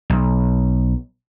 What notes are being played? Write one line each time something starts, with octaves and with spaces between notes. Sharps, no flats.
B1